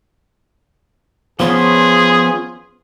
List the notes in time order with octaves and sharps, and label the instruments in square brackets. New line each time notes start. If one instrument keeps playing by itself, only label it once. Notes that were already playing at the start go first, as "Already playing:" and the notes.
[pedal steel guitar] F3 B3 C#4 [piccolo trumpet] G#4 [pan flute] C6